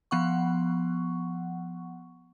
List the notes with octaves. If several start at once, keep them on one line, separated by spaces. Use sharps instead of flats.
F3 B3 F#5 C#6